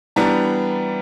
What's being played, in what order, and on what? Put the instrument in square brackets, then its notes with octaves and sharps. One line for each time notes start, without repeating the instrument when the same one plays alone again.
[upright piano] E3 G3 B3 D4 A#5